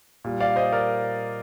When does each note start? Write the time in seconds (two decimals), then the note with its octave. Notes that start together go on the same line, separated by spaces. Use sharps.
0.24 A#2 G3
0.40 D5 F5
0.56 C5 D#5
0.72 A#4 D5